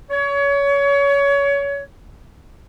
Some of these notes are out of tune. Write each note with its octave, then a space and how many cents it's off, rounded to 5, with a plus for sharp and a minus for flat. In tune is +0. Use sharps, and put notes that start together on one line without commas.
C#5 +25